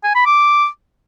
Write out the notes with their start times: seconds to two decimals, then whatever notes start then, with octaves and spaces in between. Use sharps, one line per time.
0.04 G#5
0.15 B5
0.26 D6